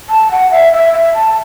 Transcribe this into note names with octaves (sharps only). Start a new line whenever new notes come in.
A5
F#5
E5
E5
E5
A5